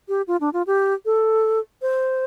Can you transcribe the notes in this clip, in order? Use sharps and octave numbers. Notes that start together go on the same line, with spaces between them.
G4
F4
D4
F4
G4
A4
C5